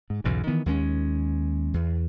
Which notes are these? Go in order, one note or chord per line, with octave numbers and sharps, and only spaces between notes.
G#2
B1 E2 G#2 C#3
D#3 E3 B3
D#2 G#3 A#3 C#4
E2